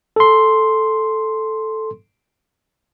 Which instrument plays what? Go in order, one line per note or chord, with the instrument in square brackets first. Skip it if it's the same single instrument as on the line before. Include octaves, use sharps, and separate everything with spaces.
[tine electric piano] A4 C6